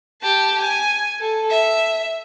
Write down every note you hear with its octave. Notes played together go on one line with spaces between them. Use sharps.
G4 A5
G#5
A4
E5